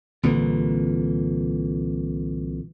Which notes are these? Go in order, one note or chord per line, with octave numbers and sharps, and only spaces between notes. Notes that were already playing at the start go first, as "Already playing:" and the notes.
C2 A#2 D3 E3